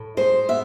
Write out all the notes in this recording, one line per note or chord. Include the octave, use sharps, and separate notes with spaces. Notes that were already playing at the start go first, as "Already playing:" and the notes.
Already playing: A2
G#3 C5
B3 E5